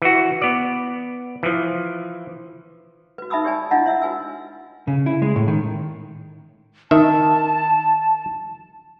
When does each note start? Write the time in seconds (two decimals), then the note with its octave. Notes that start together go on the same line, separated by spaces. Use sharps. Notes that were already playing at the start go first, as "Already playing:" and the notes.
0.02 E3 F#4
0.42 B3 D5
1.43 E3 F3
3.18 F#4 B4
3.30 D#4 E5 A5 B5 D#6 E6
3.44 G4 C#5 D5 G#5 A5
3.71 D4 E4 F4 D#5 F#5 A5
3.86 C#5 E5 E6
4.02 F#4 B4 G#5 E6
4.87 C#3
5.06 E4
5.22 G#3
5.36 A2
5.48 D#3
6.91 D#3 E5 A5